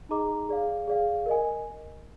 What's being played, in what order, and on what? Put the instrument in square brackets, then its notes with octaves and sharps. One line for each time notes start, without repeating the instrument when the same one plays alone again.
[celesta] D#4 G#4 D#5 A#5 D6
G#4 D5 F5
G#4 D5 F5
A#4 D#5 G#5